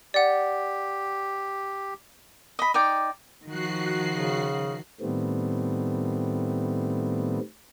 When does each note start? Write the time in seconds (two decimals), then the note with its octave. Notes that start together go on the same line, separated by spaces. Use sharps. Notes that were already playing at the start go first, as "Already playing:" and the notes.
0.14 G4 D5 F#5
2.59 D#5 B5
2.74 D#4 D5 G5
3.46 D#3 F3 F#4 F#6 C7
4.10 C#3
5.01 A2 D#3 G3 A3 B3 C4